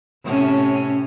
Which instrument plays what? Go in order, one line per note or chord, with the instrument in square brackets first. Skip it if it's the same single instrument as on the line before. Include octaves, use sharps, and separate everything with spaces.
[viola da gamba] A2 C3 C#4